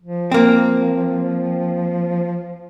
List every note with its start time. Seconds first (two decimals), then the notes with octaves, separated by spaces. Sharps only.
0.02 F3
0.32 A#3 C4